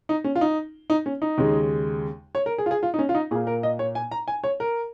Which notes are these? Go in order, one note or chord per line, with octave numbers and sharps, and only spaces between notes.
D#4
C#4
F4
D#4
D#4
C#4
D#4
D#2 C#3 G#3
C#5
A#4
G#4
F4
G#4
F4
D#4
C#4
F4
D#4
A#2 A#3 G#4
A#4
D#5
C#5
G#5
A#5
G#5
C#5
A#4